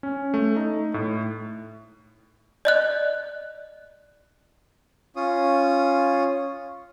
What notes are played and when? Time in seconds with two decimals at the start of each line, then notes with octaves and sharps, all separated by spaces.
0.03 C#4
0.34 A3
0.56 D#4
0.94 A2
2.65 D5 D#5 F#6
5.16 C#4 F4 C#5 D#6